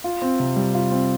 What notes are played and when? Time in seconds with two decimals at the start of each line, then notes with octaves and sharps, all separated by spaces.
0.04 F4
0.22 C4
0.40 C3
0.56 G3
0.75 F4
0.91 C4